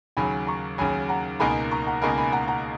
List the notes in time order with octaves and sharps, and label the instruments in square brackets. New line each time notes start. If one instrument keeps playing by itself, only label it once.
[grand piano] D#2 C#3 F#3 [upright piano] G#5 B5
[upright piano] A#5 C#6
[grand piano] D#2 C#3 F#3 [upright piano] G#5 B5
[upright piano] F#5 A#5
[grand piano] C#2 B2 A#3 D#4 A#4 [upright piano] G#5 B5
[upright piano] A#5 C#6
F#5 A#5
[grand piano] C#2 B2 A#3 D#4 A#4 [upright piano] G#5 B5
[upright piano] G#5 B5
F#5 A#5
F#5 A#5